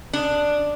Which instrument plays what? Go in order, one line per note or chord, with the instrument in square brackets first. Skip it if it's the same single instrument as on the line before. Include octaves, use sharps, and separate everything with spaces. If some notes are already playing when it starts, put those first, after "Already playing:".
[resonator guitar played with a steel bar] D4